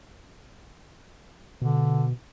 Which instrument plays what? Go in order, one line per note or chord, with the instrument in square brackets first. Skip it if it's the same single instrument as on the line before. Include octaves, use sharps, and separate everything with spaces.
[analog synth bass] B2 [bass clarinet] D3